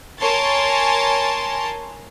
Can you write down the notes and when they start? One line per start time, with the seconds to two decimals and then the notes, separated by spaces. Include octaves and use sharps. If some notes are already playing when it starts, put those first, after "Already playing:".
0.19 A#4 C#5 G#5 A5 C6 A6